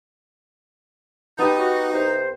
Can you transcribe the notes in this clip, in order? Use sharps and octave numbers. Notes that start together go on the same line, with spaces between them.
B3 D#4 G4 A5 D#6
F#4
C2 C5